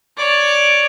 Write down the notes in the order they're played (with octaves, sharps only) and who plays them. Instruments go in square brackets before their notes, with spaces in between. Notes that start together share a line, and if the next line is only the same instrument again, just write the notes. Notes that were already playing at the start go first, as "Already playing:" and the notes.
[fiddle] C#5 D5